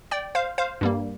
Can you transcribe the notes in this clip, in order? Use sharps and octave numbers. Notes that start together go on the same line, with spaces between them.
D5 G5
C5 F5
C5 F5
G2 G3 A#3